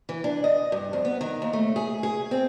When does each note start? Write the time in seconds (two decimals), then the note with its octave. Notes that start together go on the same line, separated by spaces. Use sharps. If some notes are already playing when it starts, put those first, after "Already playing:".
0.09 E3
0.24 D4
0.44 D#5
0.72 G2
0.93 F2
1.05 B3
1.21 D#3
1.42 D#2
1.53 A3
1.76 G#4
2.03 G#4
2.31 C4